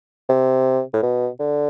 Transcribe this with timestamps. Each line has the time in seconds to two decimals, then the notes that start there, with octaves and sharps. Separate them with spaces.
0.29 C3
0.93 A2
1.03 B2
1.40 D3